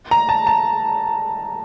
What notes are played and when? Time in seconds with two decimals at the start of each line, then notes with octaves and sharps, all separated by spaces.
0.11 A#5
0.29 A5
0.47 A5